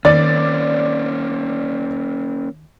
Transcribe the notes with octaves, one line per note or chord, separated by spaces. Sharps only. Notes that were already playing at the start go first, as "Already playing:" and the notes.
D#3 A#3 C4 C#4 D5 A6